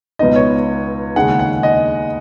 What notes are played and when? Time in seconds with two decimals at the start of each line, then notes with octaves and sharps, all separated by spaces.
0.19 C#2 B2 B3 D#4 D#5
0.35 C#5
1.16 D#2 C#3 G#3 D#4 F#5
1.39 F#5
1.63 D#5